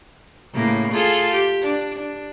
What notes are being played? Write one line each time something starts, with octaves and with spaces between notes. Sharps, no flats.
A2 C#3 A#3
F4 G#4 A4
G4
D4
D4